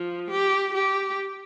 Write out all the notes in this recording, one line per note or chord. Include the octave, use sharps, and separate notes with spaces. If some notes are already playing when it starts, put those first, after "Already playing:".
Already playing: F3
G4
G4